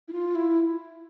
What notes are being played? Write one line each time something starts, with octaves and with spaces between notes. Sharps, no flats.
E4
F4
E4